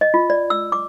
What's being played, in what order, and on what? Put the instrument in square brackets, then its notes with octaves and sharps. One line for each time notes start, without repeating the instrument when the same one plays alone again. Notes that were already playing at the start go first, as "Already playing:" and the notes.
[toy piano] D#5
F4
D5
E6
D6